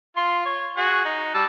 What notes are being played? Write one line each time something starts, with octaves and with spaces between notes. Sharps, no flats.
F4 C6
C#5
F#4 G#4 F#5
D#4
G3 A5 E6